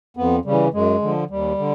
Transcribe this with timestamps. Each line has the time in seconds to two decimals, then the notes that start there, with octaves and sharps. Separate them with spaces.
0.17 F2 B3
0.45 C#3 G3
0.51 E3
0.73 F#2 G#3
1.02 D3 F3
1.30 D#2 G3
1.59 D3